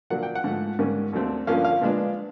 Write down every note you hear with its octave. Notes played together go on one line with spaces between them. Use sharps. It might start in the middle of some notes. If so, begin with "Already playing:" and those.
A#2 F#3 A#3 D4 F#5
G5
F#5
G#2 F3 A3
G#2 D#3 G3 A#3 C#4
D#2 D3 F#3 A3 C4
G2 D3 F3 A#3 C#4 F5
F5
A#2 F3 G#3 B3 D4